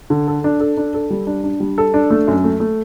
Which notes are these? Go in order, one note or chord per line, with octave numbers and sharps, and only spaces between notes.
D3
A4
D4
A4
D4
A4
G3
D4
D4
G3
A4
D4
A3
F#2
A3
A3